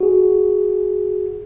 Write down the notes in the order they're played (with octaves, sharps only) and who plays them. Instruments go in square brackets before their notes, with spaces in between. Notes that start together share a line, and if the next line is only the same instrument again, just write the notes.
[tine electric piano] F#4 G#4